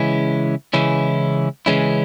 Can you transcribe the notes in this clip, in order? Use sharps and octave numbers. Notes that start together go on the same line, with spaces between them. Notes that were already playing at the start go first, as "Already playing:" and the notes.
Already playing: C#3 E3 G#3 C#4 E4
C#3 E3 G#3 C#4 E4
C#3 E3 G#3 C#4 E4